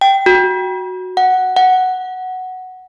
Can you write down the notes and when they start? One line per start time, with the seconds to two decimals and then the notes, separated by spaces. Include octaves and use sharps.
0.01 G5
0.26 F#4
1.17 F#5
1.57 F#5